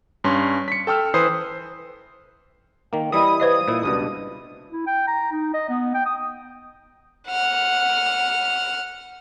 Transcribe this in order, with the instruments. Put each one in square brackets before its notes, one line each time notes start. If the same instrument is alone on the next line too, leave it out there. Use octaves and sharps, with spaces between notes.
[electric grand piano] G2 C#4 C6
B6 C#7
A4 G5 E6 F6
E3 B4 C5 D#6 C7
[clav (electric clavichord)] D#3 A#3 [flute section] G5
[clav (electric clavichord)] E3 G3 E4 [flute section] D#5 B5 [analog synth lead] D#6
[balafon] B4 C5 D#5 [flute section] F5
[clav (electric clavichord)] A#2 E4
[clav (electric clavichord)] C#2 G2 B2 [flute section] D4
[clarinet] E4
G5
A#5
D#4
D#5
B3
G5
D#6
[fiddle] F#5 F6